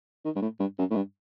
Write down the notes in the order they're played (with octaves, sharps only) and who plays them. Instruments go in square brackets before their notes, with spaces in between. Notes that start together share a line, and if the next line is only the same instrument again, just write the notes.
[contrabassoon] D#3
G2
A2
G2
F#2
A2
G2